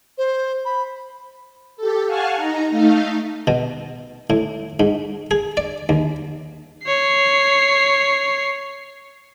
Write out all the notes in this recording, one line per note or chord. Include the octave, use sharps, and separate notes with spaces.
C5
B5
G4 A4
F5 F#5 G#5 A5 C#6 F6
D#4 A#5
A3 D#4 F5
B2
A2
G#2
G#4
D5
D#2
C#5 C7